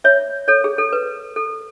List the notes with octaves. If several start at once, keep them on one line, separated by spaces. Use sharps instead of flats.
C#5 E5
A4 C#5
G#4
A4
B4
A4